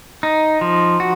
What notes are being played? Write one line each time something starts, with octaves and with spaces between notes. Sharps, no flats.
D#4
F3
F#4